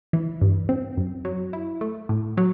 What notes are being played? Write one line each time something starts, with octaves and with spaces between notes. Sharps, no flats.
E3
G2
C4
F#2
F#3
E4
A3
A2
F#3